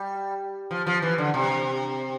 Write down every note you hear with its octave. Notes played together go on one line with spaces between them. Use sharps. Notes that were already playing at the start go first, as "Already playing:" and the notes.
Already playing: G3
F3
F3
E3
D3
C3